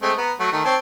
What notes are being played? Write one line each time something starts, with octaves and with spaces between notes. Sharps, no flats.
G#3 A3 C4
B3 A#5
F#3 A3
D#3 A3
C4 C#5 A5